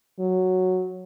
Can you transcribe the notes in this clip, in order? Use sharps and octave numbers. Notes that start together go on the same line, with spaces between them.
F#3